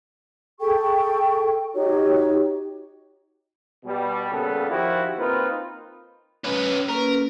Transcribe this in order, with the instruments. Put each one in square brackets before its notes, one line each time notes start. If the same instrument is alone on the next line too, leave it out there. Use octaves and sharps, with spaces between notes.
[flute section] G#4 A4 G5 C#6
D#4 F#4 G4 C#5
[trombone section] B2 G3
A#2 C#3 G3 B3 A4
D#3 F3 E4 F#4 G4
A#3 C4 D#4 F4 B4 C5
[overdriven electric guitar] C#4 B4
[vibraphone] A#3 C#4 B4 [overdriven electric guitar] A#4